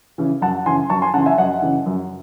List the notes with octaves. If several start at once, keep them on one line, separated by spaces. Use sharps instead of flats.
C#3 E3
F#2 F#5 A5
C#3 E3 G#5 C6
F#2 A5 C#6
G#5 C6
C#3 E3 F#5 A5
E5 G#5
F#2 D#5 F#5
C#3 E3
F#2